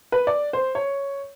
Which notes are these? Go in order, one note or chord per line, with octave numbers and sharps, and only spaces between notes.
B4
D5
C5
C#5